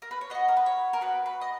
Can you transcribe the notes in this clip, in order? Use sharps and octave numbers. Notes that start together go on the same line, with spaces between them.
A#4
B4
C#5
B3 F#4 D#5
A#4
B4
C#5
A#4
B3 F#4 B4
B4
D#5